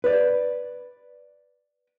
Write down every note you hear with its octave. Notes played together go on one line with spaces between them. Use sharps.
B4 D5